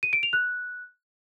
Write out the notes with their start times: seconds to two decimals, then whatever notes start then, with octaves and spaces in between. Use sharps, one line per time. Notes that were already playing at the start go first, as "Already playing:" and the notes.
0.03 D#7
0.13 D7
0.23 F7
0.33 F#6